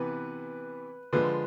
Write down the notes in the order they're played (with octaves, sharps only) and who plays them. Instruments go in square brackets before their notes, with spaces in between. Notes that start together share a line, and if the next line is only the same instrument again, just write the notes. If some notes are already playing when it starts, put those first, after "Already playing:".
Already playing: [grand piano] C3 E3 B3 [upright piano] B4
[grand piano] D3 F3 G#3 [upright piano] B4